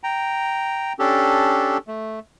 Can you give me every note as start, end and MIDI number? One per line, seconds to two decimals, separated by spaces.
0.03 0.93 79
0.03 0.93 82
0.99 1.78 61
0.99 1.78 62
0.99 1.78 67
0.99 1.78 69
1.88 2.19 57